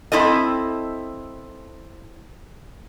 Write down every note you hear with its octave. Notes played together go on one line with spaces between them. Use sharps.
C4 E4 A4 D#5